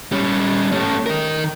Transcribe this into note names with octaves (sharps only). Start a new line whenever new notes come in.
G3 C#4
A3 C#4
D#3 A#4